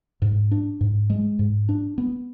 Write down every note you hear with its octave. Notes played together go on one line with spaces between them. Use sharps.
G#2
D4
G#2
G#3
G#2
D4
B3